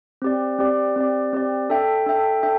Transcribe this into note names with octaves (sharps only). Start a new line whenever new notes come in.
C4 G4 D5
C4 G4 D5
C4 G4 D5
C4 G4 D5
D4 A4 E5 G5
D4 A4 E5 G5
D4 A4 E5 G5